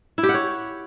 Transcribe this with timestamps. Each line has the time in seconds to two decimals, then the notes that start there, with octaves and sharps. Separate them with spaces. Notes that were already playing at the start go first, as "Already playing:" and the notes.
0.18 E4
0.23 G4
0.29 F#5
0.34 C#5